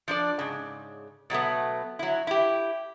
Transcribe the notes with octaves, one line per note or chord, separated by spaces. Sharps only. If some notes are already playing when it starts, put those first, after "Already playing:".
F3 D4 D5
G#2 C#3
B2 F#3 A3 B3
F#3 E4
E4 G4